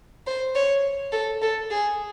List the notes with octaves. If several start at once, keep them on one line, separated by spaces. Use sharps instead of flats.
C5
C#5
A4
A4
G#4